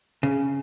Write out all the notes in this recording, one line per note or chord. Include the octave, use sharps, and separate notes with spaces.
C#3